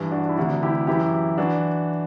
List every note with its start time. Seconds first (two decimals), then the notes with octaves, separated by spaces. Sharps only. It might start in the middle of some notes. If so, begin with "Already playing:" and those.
Already playing: G2 E3
0.12 D4 F#4
0.29 E4
0.37 D2 C3 E3 D4 F#4
0.63 E4 G4
0.87 F#2 E3 E4 G4
1.38 E3 D4 F#4